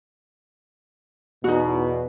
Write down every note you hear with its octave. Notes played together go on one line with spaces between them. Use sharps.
E2 B2 D#4 F#4